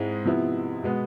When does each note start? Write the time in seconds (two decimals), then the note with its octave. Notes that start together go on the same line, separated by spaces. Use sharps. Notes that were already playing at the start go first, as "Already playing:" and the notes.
Already playing: G#2 G#3 C4 E4
0.25 C3 F3 B3 E4
0.83 B2 G#3 B3